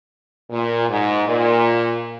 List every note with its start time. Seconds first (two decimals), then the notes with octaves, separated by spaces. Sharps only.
0.51 A#2
0.89 G#2
1.27 A#2